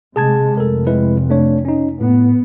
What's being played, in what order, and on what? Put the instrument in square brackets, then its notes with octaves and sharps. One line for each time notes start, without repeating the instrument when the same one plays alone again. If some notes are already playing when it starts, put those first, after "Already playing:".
[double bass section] C3 G#3 [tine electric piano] G#4 A5 G#6
[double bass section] F1 [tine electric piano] A4 A#4
[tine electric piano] G#3 E4 B4
A3 D4 C#5
C#4 D#4
[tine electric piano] A2 [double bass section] B3